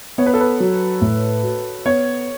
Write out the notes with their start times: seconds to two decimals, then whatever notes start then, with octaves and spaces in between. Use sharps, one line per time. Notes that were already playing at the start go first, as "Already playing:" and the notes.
0.18 B3 C#5
0.26 B4
0.34 A4
0.41 B4
0.60 F#3
1.01 A2
1.43 F#4
1.86 B3 C#5